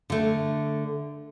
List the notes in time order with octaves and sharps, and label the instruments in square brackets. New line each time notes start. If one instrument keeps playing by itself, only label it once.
[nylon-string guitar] D3 A3